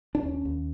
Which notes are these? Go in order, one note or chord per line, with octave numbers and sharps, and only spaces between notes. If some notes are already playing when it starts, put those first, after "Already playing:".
D4
D#2 C#4
D#2